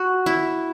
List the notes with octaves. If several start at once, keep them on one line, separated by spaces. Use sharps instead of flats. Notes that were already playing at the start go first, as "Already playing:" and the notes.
Already playing: F#4
E4